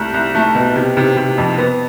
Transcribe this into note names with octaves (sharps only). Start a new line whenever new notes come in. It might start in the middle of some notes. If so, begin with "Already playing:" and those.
Already playing: C2 A3
C2
A3
B2
C3
C3
C3
F2
B3